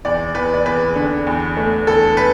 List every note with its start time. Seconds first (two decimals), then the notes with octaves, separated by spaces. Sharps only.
0.05 E2 D5
0.35 E2 B4
0.54 D5
0.66 E2 B4
0.96 D3
1.27 E2
1.57 A3
1.87 E2 A4
2.17 B4